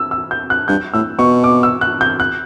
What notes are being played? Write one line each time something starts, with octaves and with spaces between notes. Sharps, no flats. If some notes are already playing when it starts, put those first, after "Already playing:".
Already playing: E6
E6
G6
F#6
G2 G6
A2 E6
B2 C#6
D6
E6
F#6
G6
F#6